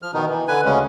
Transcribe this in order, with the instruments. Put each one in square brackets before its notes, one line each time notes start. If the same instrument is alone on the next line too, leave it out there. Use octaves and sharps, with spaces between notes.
[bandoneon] F3 F6
B2 D#3 B3 D#4
E3
D3 B4 G#5
D2 C#3 G#3 C#4